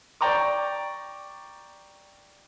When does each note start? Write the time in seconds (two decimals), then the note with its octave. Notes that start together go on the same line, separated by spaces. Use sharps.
0.21 D5 G5 A#5 C#6 D6